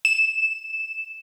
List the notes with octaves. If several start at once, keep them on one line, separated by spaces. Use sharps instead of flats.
E7